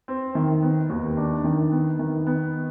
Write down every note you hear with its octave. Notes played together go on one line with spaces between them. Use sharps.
C4
D#3
B3
D#2
D4
D#3
B3
D#3
B3